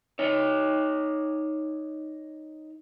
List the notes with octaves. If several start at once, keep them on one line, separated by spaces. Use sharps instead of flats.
D#4 C#5